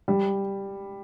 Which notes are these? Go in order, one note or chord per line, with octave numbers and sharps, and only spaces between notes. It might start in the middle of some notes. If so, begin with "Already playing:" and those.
G3